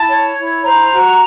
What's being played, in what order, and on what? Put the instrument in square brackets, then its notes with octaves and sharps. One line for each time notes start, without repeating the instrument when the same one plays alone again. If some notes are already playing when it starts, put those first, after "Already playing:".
Already playing: [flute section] E4 A5
C#5
E4
C5 A#5
F#4